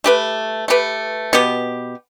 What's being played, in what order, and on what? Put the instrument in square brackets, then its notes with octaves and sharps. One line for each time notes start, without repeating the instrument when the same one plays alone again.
[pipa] A3 G4 B4
A3 G4 B4
B2 B3 G4